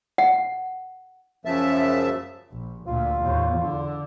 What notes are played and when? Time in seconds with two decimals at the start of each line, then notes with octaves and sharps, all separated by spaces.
0.18 F#5
1.45 F#2 C#3 F3 E5 A5
2.52 A#1
2.87 D2 A#2 F4
3.21 E2 A2
3.60 D3